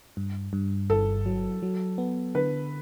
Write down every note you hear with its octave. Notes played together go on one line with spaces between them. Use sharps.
G2
G2
G1 A4
F#3
F#3
B3
D3 B4